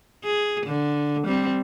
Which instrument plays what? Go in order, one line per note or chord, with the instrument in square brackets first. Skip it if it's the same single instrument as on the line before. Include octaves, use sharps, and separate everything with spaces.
[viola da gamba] G#4
D3
G3 C4